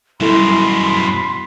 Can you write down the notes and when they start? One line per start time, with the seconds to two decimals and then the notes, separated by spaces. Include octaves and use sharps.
0.21 F#2 B2 G3 E4 A4 B5 C6